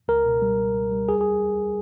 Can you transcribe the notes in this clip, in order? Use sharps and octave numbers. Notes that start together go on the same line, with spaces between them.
C#2 A#4
B2
G3
G3
C#2
G3
D#2 G#4
G#4